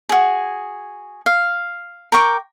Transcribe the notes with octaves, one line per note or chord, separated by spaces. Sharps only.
F#4 G#4
F5
A#4 G5 C#6 D6